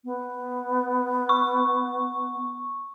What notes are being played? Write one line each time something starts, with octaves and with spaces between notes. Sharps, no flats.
B3
C#6